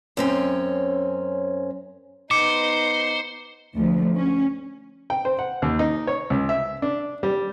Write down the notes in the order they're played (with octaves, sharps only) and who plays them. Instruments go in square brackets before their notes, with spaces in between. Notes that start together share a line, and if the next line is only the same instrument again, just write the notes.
[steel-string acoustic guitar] F#2 C4 C#4
[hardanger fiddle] B3 D#4 [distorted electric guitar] C5 [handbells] D6 [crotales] C#7
[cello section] D2 F3
C#4
[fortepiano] G5
C5
F#5
D#2
D#4
C#5
C#2
E5
D4
G3